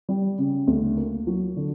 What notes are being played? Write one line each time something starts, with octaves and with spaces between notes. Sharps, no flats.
G3
C#3
D2
A#3
F#3
D3